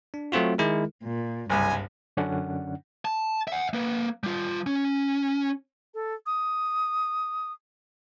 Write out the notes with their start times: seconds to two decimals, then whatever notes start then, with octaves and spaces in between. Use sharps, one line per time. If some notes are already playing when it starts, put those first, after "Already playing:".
0.14 D4
0.32 F#3 A3 C4 F4 F#4
0.58 D#3 G#3 E4 G#4 A#4
1.04 A#2
1.50 F#1 C2 G2 G#5
2.17 F#2 D3 C#4 D4 F#5
3.05 A5
3.48 E5 F#5
3.74 A#3 B4
4.24 G3 F4
4.66 C#4
5.94 A4
6.26 D#6